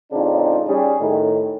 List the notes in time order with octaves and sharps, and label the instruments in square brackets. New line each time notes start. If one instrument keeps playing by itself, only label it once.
[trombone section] A1 C#3 C4 D4 D#4 F4
G3 C#4 G#4
A2 D#3